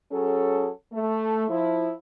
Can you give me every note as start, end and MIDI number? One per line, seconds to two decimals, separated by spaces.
0.12 0.69 54
0.12 0.69 61
0.12 0.69 68
0.12 0.69 69
0.92 1.46 57
1.48 1.92 53
1.48 1.92 64